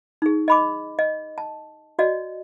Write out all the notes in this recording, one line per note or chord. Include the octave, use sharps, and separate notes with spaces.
D#4 G#4
D#5 B5 D6
D#5
A5
F#4 D5 D#5